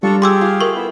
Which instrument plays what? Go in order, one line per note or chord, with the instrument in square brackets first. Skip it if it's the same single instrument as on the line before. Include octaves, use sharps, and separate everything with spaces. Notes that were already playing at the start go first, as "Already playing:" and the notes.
[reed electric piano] G3 [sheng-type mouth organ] D4 A4 C#6 [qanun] F4 A#5
[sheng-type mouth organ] G4 G#4 [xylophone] C6 D6 E6
[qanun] F4 F5
[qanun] A3 [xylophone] A#4 C#6
[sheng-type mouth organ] B3 E4